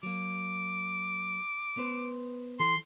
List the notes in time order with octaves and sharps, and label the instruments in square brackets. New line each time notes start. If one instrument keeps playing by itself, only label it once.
[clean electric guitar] F#3 A#3 [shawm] D6
[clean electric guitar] B3 B4 C5
[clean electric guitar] E3 A4 [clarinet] C6